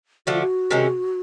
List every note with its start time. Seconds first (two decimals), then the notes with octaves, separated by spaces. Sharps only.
0.26 D3 F3 A3 F#4
0.34 F4
0.41 F#4
0.71 C3 D#3 G#3 C#4